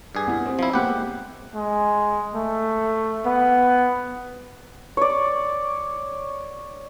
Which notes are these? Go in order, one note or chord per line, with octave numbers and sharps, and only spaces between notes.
G2 G#4
B3 E4
C4
F3 E4
A#3 B3 G4 C5 F#5
G#3
G#3
A3
B3
C#5 D5